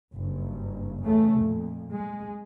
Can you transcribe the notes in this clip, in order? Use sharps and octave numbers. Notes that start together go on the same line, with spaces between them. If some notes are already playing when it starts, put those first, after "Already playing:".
F#1 G2
E2 C#3 A3
F2 A#2
G#3